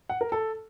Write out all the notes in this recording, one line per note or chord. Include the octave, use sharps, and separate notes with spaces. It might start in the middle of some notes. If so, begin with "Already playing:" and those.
F#5
A#4
A4